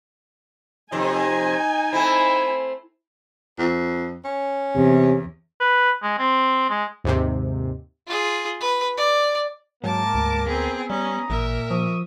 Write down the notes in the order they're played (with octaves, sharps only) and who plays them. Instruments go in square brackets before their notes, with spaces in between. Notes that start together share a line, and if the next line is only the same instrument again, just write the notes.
[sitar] F2 C3 [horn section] D#4 [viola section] G#5
[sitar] A3 C4 [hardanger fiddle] E4
[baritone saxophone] F2
C#4
[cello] E2 [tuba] C3
[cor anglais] B4
G#3
C4
G#3
[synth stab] D#2 G#2 C3
[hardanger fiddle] F4 G#4
B4
D5
[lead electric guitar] G#2 [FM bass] F#3 [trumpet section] A#3 A#4 [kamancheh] A5 D6
[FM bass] D2
[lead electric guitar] B3 [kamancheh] C4 G#4
[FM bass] G3 [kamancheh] C#4 [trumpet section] A#5 D#6
[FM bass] A1 [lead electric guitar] A#2 [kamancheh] A#4 E5
[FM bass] F3 [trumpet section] C#6 D#6